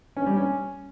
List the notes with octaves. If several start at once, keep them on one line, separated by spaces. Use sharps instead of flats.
C#4
G3
C#4